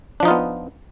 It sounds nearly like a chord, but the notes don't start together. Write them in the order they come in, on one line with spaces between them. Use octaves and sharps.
D4 F3 D#4 F4 B3